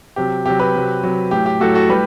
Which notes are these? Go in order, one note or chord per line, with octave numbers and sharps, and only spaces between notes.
C3 F#3 G4
C3 F#3 G4
G4 B4
C3 F#3
C3 F#3
A2 F#3 G4
G4
A2 F#3 F#4 A4
F#4 A4
A2 G3 G4 B4